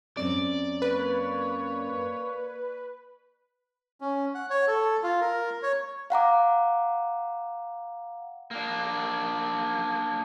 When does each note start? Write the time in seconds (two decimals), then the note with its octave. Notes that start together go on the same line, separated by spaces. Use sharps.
0.17 F#2 C4 C#4 D5
0.82 A#3 B4 C#5
4.01 C#4
4.35 F#5
4.50 C#5
4.67 A4
5.03 F4
5.21 A#4
5.63 C#5
6.10 F5 F#5 A#5 D6
8.51 A#3 D4